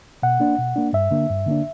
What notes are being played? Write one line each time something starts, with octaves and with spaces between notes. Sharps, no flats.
B2 F#5
A#3 D4
B2
A#3 D4
G2 E5
D3 A#3 D4
G2
D3 A#3 D4